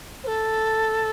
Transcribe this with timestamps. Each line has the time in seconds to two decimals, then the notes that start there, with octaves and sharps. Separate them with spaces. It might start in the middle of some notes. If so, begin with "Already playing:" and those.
0.23 C5
0.26 A4